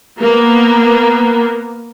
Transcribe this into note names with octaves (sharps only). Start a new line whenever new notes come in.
A#3 B3